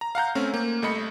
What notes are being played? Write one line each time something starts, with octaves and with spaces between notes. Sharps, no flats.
A#5
F5 F#5 A#5 G6
A3 C4 C#4
A#3
C2 A3 D#5 B5 C#7